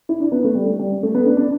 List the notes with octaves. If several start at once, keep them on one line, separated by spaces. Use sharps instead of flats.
E4
D4
B3
A3
G3
G3
A3
B3
D4
D4